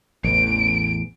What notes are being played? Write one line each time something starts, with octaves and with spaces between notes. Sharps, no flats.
A1 E2 D7